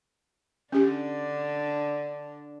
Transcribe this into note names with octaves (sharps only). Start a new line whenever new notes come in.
D3 C#4 D4 G4